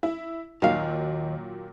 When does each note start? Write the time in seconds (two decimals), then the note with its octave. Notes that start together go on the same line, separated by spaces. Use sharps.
0.03 E4
0.62 D#2 A#2 D#3 F#3 F5